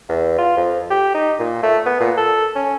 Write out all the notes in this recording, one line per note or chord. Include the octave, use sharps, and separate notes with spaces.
E2
F4
F2
G4
D#4
A#2
A3
B3
A#2
A4
C#4